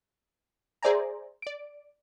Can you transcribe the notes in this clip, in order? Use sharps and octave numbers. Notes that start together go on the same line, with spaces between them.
G#4 C5 D5 E5 G#5 A#5
D5 D7